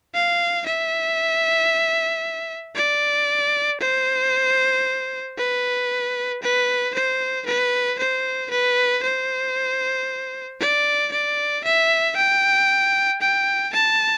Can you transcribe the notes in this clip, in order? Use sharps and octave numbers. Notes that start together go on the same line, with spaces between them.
F5
E5
D5
C5
B4
B4
C5
B4
C5
B4
C5
D5
D5
E5
G5
G5
A5